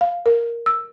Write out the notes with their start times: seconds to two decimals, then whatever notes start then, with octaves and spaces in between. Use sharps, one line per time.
0.01 F5
0.26 A#4
0.66 E6